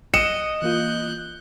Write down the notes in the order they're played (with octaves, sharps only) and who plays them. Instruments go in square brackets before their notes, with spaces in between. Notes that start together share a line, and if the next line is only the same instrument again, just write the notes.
[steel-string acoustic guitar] D#5 [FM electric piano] F#6 [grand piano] C#7 E7
[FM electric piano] E3 A#3 F4 [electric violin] F#6 G6